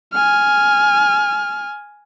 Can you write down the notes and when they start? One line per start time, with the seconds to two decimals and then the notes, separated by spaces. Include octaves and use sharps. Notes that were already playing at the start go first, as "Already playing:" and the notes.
0.13 G#5 F6